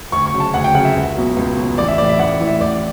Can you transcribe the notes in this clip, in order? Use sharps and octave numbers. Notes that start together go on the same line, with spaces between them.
D2 C#6
C#6
C#3 F#3
A5
D2 F#5
G5
C#3 F#3 F#5
E5
C#2
B2 F#3
C#2
B2 F#3
A1 D5
E5
A2 E3 D5
E5
A1 F#5
A2 E3
E5
A1 D5